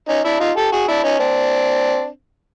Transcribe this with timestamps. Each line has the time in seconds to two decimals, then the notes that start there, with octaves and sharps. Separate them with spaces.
0.09 C#4 D#4
0.24 D4 E4
0.40 D#4 F4
0.56 G4 A4
0.72 F#4 G#4
0.88 D4 E4
1.04 C#4 D#4
1.19 C4 D4